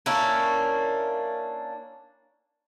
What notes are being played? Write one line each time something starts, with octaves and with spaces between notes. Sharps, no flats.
A#3 C#4 D4 E4